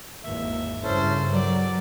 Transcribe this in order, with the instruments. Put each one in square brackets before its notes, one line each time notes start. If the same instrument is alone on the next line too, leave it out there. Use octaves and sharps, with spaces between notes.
[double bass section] G#1 E2 A#3 [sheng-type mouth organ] E5
[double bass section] G2 C#3 [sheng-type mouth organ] C#4 E4 A4 [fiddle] C5
[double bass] F#3 [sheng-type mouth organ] A#4 [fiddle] D5